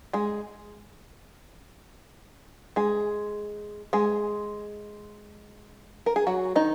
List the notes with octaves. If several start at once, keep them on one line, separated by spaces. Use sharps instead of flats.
G#3 G#4
G#3 G#4
G#3 G#4
A#4
G#4
F#3 F#4
D#3 D#4